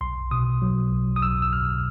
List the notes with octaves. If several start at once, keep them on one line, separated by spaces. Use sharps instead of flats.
B1 C6
B2 D#6
F#3
B1
D#6
B1 E6
E6
B2 F6